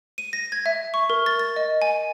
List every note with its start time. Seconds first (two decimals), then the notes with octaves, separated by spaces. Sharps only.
0.18 D#7
0.33 A#6
0.52 G#6
0.66 E5
0.94 C#6
1.10 A#4
1.26 A6
1.39 A6
1.56 D#5
1.82 G#5